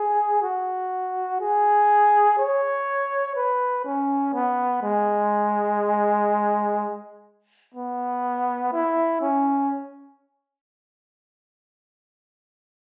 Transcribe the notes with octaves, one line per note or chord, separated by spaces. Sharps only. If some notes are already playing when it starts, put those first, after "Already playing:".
Already playing: G#4
F#4
G#4
C#5
B4
C#4
B3
G#3
B3
E4
C#4